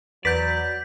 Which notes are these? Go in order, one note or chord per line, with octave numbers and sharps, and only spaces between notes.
E2 F#3 B4 D5 G6 B6